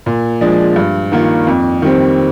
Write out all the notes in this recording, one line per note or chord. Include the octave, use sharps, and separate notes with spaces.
A#2
F3 G#3 D4 G#4
G2
D#3 A#3 F4
F2
D#3 G3 C4